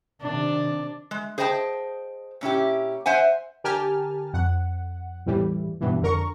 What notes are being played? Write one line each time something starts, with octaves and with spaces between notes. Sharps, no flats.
C3 D#3 D4
G#3
G#4 C5 D#5 G5 A5
A#2 C#4 E4 G4
C5 E5 F#5 G#5
D3 G4 A#4 G#5 A5 F6
F2 F#5
E2 A2 E3 G3
G2 B2 E3
F2 D3 A#4 C#6